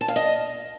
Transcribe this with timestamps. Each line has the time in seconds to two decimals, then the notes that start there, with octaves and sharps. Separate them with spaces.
0.01 A5
0.08 F5
0.16 D#5